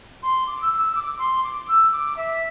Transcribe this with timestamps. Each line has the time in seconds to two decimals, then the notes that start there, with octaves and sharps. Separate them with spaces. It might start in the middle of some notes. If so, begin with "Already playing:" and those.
0.22 C6
0.46 D6
0.62 E6
0.78 E6
0.95 D6
1.18 C6
1.43 D6
1.68 E6
1.91 D6
2.16 E5